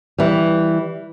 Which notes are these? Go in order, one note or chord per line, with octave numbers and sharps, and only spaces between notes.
E3 G3